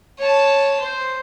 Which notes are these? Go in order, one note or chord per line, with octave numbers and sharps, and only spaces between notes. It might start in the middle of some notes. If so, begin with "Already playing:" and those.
C#5 A5
C5